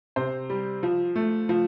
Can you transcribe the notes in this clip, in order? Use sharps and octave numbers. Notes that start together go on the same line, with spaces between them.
C3 C5
G3
F3
A3
F3